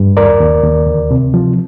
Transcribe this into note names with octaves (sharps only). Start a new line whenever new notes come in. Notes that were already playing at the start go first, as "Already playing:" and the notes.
Already playing: G2
D#2 A#4 D5
D#2
D#2
D2
C3
F3